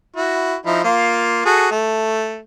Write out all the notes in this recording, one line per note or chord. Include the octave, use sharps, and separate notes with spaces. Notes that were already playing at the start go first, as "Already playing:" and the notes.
E4 F#4
F3 D#4 E4
A#3 F4
F#4 G#4 A4
A3